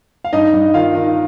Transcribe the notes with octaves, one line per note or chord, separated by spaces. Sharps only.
F5
G2 D#4 D#5
G2
D#3 F4 F5
D#3